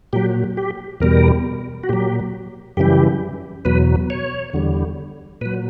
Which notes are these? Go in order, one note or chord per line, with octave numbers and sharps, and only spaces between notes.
A#2 F#3 G4
G4
E2 B2 G3 A#4
F#4
A#2 F#3 G4
F#2 C#3 E3 G3 G4
E2 B2 F#3 B4
C#5
E2 D3 G3
A#2 F#3 B4